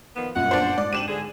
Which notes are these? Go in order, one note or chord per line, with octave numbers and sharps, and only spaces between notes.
D#3 F3 B3
G1 F#2 A#2 F#5
D4 C5
G#2 D5
C4 D4 G4 D#7 E7 F#7
D3 G#4